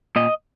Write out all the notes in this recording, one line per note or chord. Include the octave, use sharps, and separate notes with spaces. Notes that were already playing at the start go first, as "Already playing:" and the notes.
A#2 D#5